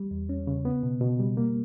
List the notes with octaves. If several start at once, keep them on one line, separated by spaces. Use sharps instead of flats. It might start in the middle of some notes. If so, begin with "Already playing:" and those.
Already playing: G3
E2
C#4
C#3
B3
B2
B2
G3
A#3